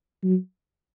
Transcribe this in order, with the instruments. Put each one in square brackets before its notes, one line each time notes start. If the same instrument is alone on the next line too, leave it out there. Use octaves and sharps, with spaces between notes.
[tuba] F#3